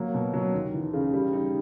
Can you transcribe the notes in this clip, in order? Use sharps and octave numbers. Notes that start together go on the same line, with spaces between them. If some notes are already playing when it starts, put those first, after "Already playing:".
Already playing: F#3 A#3
B2
F#3
D#2
E3
C#3
G3
D#4